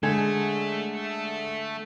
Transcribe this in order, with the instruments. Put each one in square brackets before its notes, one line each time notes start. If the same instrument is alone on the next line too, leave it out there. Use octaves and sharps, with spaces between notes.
[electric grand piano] D3 G#6 [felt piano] G#3 G#5 [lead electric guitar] A3 A4